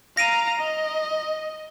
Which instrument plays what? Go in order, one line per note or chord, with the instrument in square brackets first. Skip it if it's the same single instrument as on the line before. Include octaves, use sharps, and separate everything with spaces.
[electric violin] F5 A#5 [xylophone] A#6 D7 D#7
[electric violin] D#5